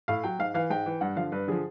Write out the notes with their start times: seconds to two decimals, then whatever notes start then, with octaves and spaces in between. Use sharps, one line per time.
0.08 A2 F5
0.24 F#3 G5
0.39 G#2 F5
0.54 E3 F5
0.70 G#2 G5
0.86 E3
1.01 G2 F#5
1.16 D3 F3 F5
1.32 G2 B4
1.48 D3 F3 G#4